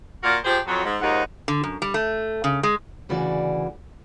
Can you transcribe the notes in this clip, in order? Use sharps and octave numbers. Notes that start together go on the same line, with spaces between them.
A#2 F4 F#4 A#4
F3 G4 G#4 C5
F2 F#3
G#2
D#2 G#2 F3 D#4 F#5
D3
F#2
G3
A3
C#3
G#3
D2 C#3 E3 F#4 D5